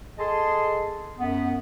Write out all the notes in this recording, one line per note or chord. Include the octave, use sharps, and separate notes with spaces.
G#4 A4 D#5 A5 C6
F#2 B3